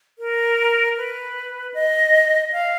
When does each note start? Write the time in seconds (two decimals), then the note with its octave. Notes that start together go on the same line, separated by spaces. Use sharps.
0.19 A#4
0.97 B4
1.74 D#5
2.52 F5